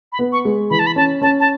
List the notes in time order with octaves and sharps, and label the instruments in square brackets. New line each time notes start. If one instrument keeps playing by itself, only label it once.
[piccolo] B5
[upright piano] B3
[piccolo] C#6
[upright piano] G#3
[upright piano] E3 [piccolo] B5
[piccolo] A5
B5
[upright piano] C#4 [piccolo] A5
[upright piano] C#4 [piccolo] A5
[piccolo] A5